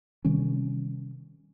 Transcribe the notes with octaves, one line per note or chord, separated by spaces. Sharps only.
C3 D#3 G3 C#4